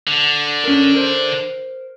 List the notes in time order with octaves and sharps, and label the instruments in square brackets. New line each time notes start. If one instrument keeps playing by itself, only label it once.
[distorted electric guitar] D3
[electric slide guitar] C#4 A#4
A#4 C5